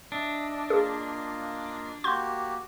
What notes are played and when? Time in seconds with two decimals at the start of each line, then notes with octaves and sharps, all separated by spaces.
0.12 D4 D#5 E5
0.70 A#3 F4 G#4 D#5
2.04 A#3 F#4 G4 C6 G6